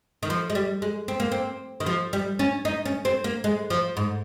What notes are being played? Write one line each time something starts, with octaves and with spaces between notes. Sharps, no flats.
D#3
F3
G#3
G3
G#3
C4
A#3
C4
D#3
F3
G3
C#4
D#4
C#4
C4
A#3
G#3
F3
G#2